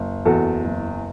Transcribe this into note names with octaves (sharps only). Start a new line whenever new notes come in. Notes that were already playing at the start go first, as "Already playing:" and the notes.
Already playing: F#1
E2 F#4 A4
F#1